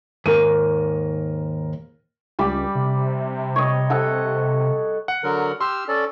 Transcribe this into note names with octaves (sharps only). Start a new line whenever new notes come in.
D#2 G#2 A#4 D#7
C#2 G3 B5 D6
C3
C#5 D#5
A4 F#5
F#5
D3 F#3 A#4
G4 C6 E6 F6
C#4 A4 D5